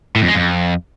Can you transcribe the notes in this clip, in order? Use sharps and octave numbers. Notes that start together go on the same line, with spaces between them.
A2
F2
G#3
F2